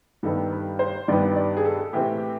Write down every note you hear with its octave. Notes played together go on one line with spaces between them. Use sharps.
G2 D#3 G3 B3 A4
B4
C5
G2 D#3 G3 B3 D5
D5
G#4
A4
A2 E3 A3 C4 G4